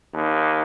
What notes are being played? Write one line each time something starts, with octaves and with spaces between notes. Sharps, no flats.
D#2